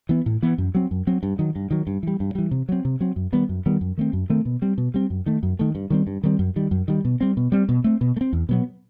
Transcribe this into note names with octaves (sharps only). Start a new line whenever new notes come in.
E3 B3
A2
E3 B3
F#2
F#3 C4
F#2
F#3 C4
G2
D#3 F#3
G2
D#3 F#3
G2
E3 G3
G2
E3 G3
C3
F#3 C4
C3
F#3 C4
F#2
D#3 G3 B3
F#2
D#3 G3 B3
F#2
D#3 A3 C4
F#2
D#3 A3 C4
B2
G3 C4
B2
G3 C4
F#2
D#3 A3
F#2
D#3 A3
G2
D#3 G3 C4
G2
D#3 G3 C4
F#2
D#3 G3
F#2
D#3 G3
B2
G3 C4
B2
G3 C4
B2
A3 C4
B2
A3
C4
E2
B2 F#3 B3